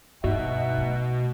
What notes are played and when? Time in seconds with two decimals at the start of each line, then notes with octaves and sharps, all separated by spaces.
0.24 G2 B2 D#4 E5 F#5
0.77 G#3 A3